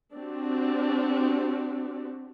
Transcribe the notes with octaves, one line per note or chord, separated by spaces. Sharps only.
C4 D4 F#4 G4